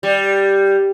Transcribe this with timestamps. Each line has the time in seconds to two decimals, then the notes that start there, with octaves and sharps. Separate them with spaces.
0.03 G3